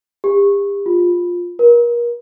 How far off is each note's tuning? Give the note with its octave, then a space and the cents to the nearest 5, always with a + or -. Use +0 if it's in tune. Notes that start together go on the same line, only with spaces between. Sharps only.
G4 +40
F4 +15
A#4 +35